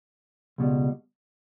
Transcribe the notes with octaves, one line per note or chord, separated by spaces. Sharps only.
C#2 B2 G3